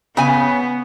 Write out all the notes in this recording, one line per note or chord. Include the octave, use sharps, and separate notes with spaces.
C#3 B3 G#5